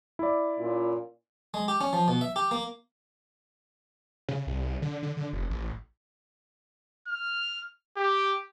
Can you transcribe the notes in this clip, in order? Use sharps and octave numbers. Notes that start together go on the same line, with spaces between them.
E4 D5
A#2 C#4 F4
G#3
G4
C#4
F3
B2
E5
G4
A#3
C#3
C2
D3
D3
D3
F1
A1
F6
G4